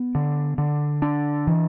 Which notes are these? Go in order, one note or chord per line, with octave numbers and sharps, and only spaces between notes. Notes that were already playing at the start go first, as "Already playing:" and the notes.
Already playing: B3
D3
D3
D4
E3